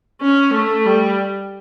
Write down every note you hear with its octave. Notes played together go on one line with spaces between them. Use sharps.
C#4
A3
G3